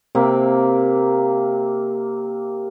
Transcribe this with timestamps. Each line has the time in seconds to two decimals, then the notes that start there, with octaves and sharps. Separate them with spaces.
0.15 C3 A#3 E5